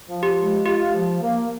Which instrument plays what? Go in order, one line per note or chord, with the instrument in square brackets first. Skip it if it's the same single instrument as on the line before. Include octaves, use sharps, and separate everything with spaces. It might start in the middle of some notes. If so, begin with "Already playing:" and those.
[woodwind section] F3
[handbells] G4
[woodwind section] G#3
[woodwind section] F4 [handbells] G4
[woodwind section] F3
A#3